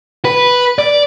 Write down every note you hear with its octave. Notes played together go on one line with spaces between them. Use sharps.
B4
D5